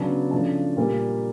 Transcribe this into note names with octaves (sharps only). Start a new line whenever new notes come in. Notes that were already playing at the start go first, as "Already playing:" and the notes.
Already playing: C#3 F#3 B3 D4 A5
C#3 F3 A3 D4 A5
A#2 G3 A#3